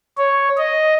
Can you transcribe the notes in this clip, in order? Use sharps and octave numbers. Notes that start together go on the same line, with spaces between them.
C#5
D#5